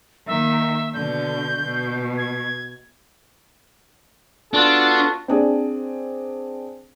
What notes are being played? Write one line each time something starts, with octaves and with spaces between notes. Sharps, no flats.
D#3 A#3 E5
B2 D3 G6
B2
G#6
B3 D4 F4 F#4 A4
C4 D4 G#4